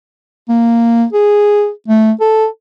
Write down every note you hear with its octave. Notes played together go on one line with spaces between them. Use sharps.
A#3
G#4
A3
A4